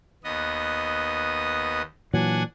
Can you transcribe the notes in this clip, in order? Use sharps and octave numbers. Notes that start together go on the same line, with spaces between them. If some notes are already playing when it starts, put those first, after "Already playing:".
D#2 B3 D#5
A#2 E3 F#3 D4 F#5 G#5